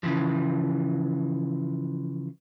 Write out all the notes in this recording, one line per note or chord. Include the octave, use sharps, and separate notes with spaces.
C#3 E3 F3